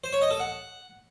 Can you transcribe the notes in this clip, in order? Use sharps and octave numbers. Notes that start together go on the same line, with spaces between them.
C5
C#5
D#5
A4
F#5